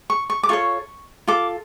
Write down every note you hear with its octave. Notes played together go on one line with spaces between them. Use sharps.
C#6
C#6
D6
F4 A4 C#5 C#6
F4 A4 D6